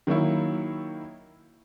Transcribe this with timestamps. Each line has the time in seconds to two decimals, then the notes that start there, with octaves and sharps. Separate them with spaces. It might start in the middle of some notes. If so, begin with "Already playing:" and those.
0.07 D#3 F#3 A#3 E4